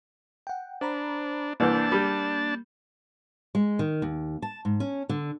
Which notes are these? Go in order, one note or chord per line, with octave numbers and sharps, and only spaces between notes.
F#5 G5
D4 C5 A#5 B5
C2 E3 A#3 D4 A5 G6
G3
G#3
D#3
D#2
A5
G#2
C#4
D3